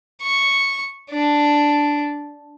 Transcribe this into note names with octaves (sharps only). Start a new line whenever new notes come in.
C#6
D4